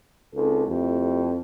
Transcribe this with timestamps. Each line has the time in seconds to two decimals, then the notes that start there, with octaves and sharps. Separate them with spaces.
0.34 C#2 C4 D#4 A4
0.67 F2 A3 E4 G4